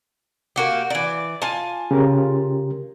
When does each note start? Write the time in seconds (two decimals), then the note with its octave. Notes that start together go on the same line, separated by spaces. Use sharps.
0.56 A#3 F#4 G4
0.90 E3 D5
1.42 F4 G#5 A5
1.91 C#3 G4 A#4